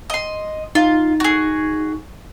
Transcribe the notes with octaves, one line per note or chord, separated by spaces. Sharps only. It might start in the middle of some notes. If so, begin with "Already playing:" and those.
D#5 C6
D#4 F4
F#4 G#4